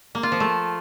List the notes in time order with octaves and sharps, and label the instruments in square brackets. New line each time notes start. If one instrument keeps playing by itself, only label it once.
[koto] A#3
F4
F3
A3